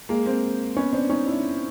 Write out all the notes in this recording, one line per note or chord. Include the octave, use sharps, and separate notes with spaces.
G#3 A#3
A#3 C4
B3 C#4
C4 D4
C#4 D#4
D4 E4